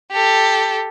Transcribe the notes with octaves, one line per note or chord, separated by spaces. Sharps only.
G4 A4